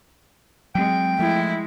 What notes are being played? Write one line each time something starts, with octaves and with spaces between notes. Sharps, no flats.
F#3 G#3 C4 G5
F3 G#3 A3 E4